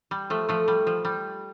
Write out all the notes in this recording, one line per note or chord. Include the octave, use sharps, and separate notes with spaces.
G3
F3 A3
F3 A3
G3
F3
G3